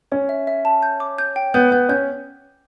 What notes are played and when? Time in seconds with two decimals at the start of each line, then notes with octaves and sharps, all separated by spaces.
0.12 C#4 C#5
0.29 E5
0.47 E5
0.65 A5
0.83 G6
1.00 D6
1.18 G6
1.36 G5
1.54 B3 G6
1.72 B3 G6
1.89 C#4 G6